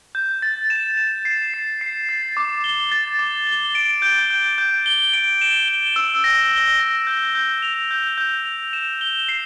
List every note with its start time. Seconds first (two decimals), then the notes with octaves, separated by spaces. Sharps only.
0.15 G6
0.42 A6
0.70 E7
0.97 E7
1.25 C7
1.54 C7
1.81 C7
2.09 A6
2.37 D6
2.64 G7
2.92 A6
3.19 D6
3.47 G7
3.75 D7
4.02 G6
4.30 G6
4.58 G6
4.86 G7
5.13 D7
5.41 E7
5.68 G7
5.96 E6
6.24 A#6
6.52 G7
6.80 A#6
7.07 G6
7.35 G6
7.62 F7
7.91 G6
8.18 G6
8.46 F7
8.73 E7
9.01 G7
9.29 C7